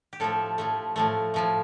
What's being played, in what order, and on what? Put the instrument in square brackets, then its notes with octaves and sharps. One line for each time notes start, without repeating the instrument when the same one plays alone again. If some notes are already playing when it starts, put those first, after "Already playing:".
[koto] G4
A2 F3 A3 A4
A2 F3 A3
A2 F3 A3
A2 F3 A3